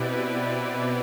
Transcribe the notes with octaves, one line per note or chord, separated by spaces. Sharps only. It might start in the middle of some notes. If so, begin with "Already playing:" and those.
Already playing: B2 C4 E4 G4 B4 D5